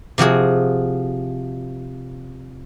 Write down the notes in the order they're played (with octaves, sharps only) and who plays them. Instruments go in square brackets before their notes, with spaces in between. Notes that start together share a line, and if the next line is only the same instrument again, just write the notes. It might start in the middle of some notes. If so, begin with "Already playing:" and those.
[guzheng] C3 F3 F#4 G#4